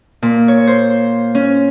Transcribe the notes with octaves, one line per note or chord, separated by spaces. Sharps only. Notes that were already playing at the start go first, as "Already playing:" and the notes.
A#2
C#5
C5
C#4